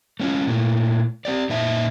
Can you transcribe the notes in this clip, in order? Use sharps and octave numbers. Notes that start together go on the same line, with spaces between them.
A3 C#4 F4
A#2 A3
C4 G4 D5
A#2 D#4 E5 A5